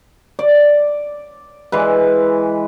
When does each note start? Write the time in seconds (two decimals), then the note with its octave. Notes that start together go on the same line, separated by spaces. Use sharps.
0.39 D5
1.72 E3 G#3 B4